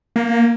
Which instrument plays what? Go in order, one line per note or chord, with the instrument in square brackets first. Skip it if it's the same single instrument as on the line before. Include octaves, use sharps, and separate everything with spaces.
[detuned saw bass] A#3